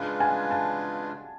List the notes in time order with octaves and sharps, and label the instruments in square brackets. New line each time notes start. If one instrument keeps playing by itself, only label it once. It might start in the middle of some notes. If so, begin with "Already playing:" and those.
Already playing: [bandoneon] C#3 G#3 D4 F4 B4 [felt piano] F5
[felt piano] G#5
A5